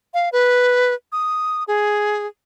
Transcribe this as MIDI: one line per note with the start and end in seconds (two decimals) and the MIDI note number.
0.14 0.29 77
0.32 0.94 71
1.12 1.64 87
1.68 2.27 68